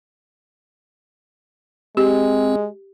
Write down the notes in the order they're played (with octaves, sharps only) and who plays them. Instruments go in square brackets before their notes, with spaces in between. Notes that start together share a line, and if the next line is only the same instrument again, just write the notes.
[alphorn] G#3 [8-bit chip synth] C4 [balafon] G4